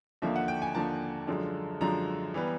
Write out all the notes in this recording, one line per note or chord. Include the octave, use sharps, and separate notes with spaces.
D#2 D3 F3 A#3 E5
F#5
G5
G#5
D#2 D3 F3 A#3 A5
F#2 D3 F3 G#3
F#2 D3 F3 G#3 A#5
E3 G3 B3